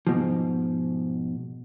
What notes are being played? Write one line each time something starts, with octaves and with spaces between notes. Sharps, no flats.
G#2 B2 F3